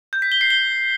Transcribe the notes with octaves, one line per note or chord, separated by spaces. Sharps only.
G6
B6
G7
C7
G7